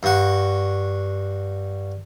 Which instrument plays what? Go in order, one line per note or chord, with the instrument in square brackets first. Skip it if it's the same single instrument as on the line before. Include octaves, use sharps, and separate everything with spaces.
[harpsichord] G2 F#4